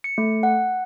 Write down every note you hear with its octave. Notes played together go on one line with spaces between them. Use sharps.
C#7
A3
F#5